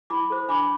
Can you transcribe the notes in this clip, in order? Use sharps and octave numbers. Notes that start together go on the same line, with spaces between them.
E4 B5 D6
A4 C5
D4 B5 D6